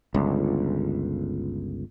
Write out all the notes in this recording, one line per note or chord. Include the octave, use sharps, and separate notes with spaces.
G1 C#2